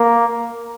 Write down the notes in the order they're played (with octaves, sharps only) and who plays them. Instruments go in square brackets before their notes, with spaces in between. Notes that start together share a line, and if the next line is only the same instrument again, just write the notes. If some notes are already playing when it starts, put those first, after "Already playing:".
Already playing: [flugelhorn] A#3